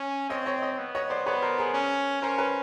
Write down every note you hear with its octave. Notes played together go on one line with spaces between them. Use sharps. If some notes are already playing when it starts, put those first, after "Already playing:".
Already playing: C#4
C4 C#5 D#5
C#5 D#5
C#5 D#5
B3
C#5 D#5
C5 D5
B3 B4 C#5
A#4 C5
G#4 A#4
C#4
C#4 A#4 C5
B4 C#5